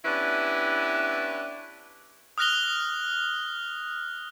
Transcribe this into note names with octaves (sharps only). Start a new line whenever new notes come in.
B3 C#4 D4 E4 G4 B4
D#6 F6 F#6 A#6 F7 G7